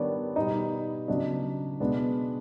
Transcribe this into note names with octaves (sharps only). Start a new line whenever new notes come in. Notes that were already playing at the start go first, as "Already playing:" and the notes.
Already playing: D#3 G3 B3 D4 C#5 D5
B2 G3 B3 D#4 D#5
C#3 F#3 B3 D4 D#5
B2 G#3 B3 D4